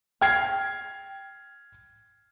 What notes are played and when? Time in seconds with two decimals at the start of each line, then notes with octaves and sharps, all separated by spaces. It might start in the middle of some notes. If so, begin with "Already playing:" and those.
0.21 G5 F6 G#6 C7